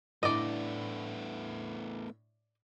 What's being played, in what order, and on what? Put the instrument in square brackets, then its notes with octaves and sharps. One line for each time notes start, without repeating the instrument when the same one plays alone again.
[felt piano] A2 D4 [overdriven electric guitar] A3 B3 [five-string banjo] D5 D#5